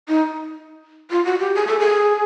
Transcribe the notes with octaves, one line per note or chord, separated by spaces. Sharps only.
D#4
F4
F#4
G4
G#4
A4
G#4